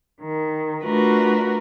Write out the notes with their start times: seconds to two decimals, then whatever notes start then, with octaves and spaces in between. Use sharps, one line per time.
0.22 D#3
0.84 A3 D4 F4 F#4 A#4 B4